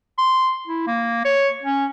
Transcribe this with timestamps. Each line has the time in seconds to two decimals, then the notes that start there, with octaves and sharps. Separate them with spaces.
0.18 C6
0.67 E4
0.87 A#3
1.25 C#5
1.63 C#4